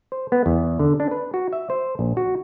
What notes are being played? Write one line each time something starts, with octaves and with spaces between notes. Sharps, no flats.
C5
B3
E2
D3
D4
B4
F#4
E5
C5
A#1
F#4